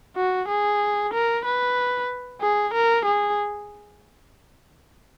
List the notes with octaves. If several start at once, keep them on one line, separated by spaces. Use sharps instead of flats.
F#4
G#4
A#4
B4
G#4
A#4
G#4